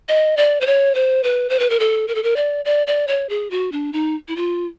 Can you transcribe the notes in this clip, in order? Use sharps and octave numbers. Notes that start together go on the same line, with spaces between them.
D#5
D5
C5
C#5
C5
B4
C5
B4
A#4
A4
A#4
A4
A#4
D5
D5
D5
C#5
G#4
F#4
D4
D#4
E4
F4